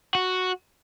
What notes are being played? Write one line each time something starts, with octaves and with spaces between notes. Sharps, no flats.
F#4